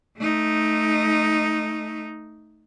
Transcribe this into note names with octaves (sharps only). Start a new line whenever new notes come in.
A3 D#4